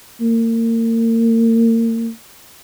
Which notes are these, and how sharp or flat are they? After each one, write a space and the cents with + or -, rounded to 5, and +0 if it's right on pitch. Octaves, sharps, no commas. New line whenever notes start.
A#3 -35